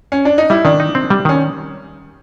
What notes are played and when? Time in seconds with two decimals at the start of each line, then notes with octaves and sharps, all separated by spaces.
0.12 C#4
0.25 D4
0.38 D#4
0.50 G3 E4
0.65 D#3 D4
0.80 D#4
0.95 C4
1.10 G3
1.25 D#3 C#4